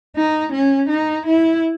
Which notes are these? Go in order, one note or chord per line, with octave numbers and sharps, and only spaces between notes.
D#4
C#4
D#4
E4